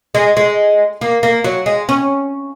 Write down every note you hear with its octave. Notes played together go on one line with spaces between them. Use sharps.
G#3
G#3
A#3
A#3
F#3
G#3
C#4